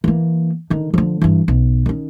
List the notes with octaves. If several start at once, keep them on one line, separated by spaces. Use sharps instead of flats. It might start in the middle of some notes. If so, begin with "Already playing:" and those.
E3 A#3
D3 D#3
D3 F3
G2 E3
B1
D#3 C#4